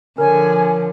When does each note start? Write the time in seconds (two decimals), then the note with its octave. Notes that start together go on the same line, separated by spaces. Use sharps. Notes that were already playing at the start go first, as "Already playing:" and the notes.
0.18 D3 F3 A#4 C#5 G#5